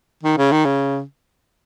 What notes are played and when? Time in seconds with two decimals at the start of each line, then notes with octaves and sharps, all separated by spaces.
0.23 D#3
0.37 C#3
0.52 D#3
0.65 C#3